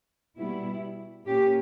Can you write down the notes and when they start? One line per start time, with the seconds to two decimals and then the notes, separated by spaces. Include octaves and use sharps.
0.38 B2 G3 B3 E4
1.26 A#2 A#3 C#4 G4